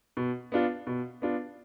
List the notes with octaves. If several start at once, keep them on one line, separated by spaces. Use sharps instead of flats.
B2
B3 D4 F4
B2
B3 D4 F4